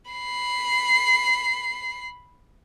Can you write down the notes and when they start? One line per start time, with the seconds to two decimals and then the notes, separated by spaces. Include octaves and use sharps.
0.11 B5 C7